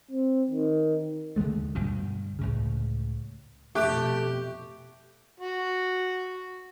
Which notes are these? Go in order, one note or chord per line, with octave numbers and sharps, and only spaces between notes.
C4
D#3
D#2 D3 G#3 A3
D2 G2 B2
C#2 A2 C#3
F2 B2 A3 G4 E5 C#6 F#6
F#4